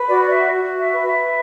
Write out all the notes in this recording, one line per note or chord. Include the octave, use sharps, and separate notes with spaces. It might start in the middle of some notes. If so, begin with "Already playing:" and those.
Already playing: B4
F#4 D5
E5
F#4
E5
B4
E5